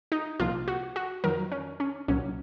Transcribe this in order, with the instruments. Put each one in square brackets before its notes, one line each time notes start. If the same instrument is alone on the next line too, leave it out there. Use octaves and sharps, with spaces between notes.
[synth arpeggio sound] D#4
C2 A#2 F3 F4
F#4
F#4
F2 D#3 F#3 A#4
C#4
C#4
C2 A#2 F#3 C#4